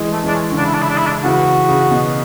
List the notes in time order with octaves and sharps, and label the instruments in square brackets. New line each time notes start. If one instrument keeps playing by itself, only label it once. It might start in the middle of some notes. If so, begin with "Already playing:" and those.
Already playing: [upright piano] E3 G#3
[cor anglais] A3
[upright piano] E3 G#3 [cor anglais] D4
[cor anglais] C#4
[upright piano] D3
[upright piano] C#3 [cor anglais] D4
[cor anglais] E4
D4
E4
D4
E4
D4
[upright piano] C#3 E3 [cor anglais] F#4
[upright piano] C#3
B2